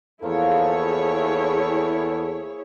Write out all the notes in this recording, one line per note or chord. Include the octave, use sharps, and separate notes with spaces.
E2 F3 A#3 E4 G#4 A4 C#5